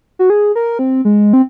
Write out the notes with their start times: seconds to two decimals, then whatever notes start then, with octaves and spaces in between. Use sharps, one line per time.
0.19 F#4
0.30 G#4
0.55 A#4
0.79 C4
1.05 G#3
1.33 C4